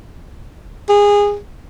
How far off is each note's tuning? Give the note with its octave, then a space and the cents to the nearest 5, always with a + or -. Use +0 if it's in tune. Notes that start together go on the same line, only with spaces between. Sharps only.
G#4 -20